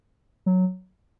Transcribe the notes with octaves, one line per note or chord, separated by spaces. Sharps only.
F#3